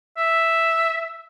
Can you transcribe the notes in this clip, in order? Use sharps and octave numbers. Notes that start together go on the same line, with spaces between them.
E5